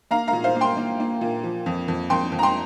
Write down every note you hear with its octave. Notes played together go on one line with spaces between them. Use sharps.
A#3 F5 A#5
F5 A#5
A#2
C5 F5
A#3
G5 C6
A#3
A#3
A#2
F3
F2
F2
F2 G5 C6
F2
A#5
G5 C6